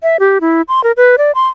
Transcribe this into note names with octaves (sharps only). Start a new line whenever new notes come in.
E5
G4
E4
C6
A#4
B4
D5
C6